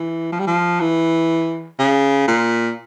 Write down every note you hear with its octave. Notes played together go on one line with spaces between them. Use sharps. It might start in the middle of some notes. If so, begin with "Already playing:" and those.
Already playing: E3
F3
G3
F3
E3
C#3
A#2